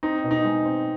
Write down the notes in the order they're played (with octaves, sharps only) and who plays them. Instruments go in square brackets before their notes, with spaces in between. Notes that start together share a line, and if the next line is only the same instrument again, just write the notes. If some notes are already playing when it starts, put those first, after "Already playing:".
[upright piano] C4 [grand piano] D#4
[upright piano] B2
[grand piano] D#4
[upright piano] G#3
C4